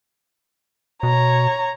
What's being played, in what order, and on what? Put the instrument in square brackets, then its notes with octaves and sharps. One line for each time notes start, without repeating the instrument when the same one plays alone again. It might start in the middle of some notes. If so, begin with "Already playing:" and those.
[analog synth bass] B2 [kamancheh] C#5 A#5